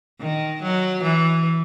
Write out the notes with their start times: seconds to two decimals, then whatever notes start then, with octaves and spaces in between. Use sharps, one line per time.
0.20 D#3
0.62 F#3
1.03 E3